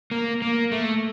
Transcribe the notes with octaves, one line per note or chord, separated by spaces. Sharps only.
A#3
A#3
A3